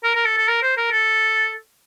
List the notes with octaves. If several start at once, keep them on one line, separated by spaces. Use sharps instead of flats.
A#4
A#4
A4
A4
A#4
C5
A#4
A4